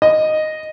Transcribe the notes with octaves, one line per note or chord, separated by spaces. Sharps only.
D#5